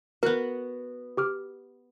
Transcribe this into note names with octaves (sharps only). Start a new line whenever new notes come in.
B3 F#4 A#4 F#6
G4 D6 F6